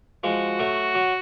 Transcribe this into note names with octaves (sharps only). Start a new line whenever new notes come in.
F3 G#3 F#4
F#3 A3
F#3